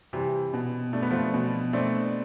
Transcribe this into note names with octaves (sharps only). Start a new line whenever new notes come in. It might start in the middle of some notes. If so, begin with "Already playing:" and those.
C3 E3 G3
B2
A3 D4
B3
F3 A3
B2
A3 C4 D4